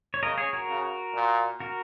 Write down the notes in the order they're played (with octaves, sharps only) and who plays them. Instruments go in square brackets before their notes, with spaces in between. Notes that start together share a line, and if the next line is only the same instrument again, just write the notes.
[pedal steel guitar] C#5
[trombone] C#3 [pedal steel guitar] A#4 D#5
[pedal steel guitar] G#4 C#5
F#4 A#4
[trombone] C#3
A#2
[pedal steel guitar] F#4 A#4